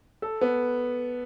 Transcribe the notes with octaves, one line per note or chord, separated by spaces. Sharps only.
A4
B3